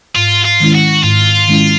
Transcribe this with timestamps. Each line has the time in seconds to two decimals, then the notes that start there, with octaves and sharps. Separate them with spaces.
0.16 G#2 F4
0.45 F4
0.60 D#3 G#3 C#4 E4
0.75 F#4
1.03 G#2 F4
1.48 D#3 G#3 C#4 E4